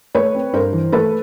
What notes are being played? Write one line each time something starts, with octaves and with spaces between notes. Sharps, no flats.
A3 B4 C#5
C4
G2 A#4 C5
E3
A3 A4 B4